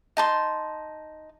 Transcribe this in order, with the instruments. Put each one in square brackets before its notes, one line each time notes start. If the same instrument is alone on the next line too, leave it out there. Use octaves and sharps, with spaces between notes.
[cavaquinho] D#4 A5 C6